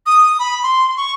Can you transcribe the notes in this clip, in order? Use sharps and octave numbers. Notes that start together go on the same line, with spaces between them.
D#6
B5
C6
C#6